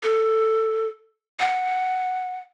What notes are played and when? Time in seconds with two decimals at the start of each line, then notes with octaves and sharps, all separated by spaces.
0.03 A4
1.40 F#5